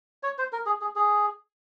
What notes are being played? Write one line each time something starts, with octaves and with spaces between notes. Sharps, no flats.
C#5
C5
A#4
G#4
G#4
G#4